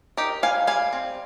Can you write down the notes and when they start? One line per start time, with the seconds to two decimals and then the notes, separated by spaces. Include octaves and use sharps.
0.17 D#4 G4 A#4
0.43 G3 F5 G#5
0.67 G3 F5 G#5
0.93 C4